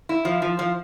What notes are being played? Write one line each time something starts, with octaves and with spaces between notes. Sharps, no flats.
E4
F3
F3
F3